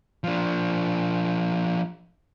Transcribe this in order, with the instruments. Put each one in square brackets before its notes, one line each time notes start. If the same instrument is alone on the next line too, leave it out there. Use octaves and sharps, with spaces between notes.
[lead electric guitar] F3 D4